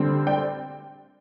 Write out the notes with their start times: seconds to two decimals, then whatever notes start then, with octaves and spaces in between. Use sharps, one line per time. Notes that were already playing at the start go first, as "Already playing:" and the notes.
Already playing: D3 G3 C4
0.27 D5 G5